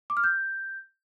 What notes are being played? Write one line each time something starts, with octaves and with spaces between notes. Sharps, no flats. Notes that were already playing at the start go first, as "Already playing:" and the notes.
D6
F6
G6